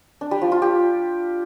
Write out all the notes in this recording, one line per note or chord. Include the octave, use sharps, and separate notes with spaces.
D4
G3
F3
F4
G4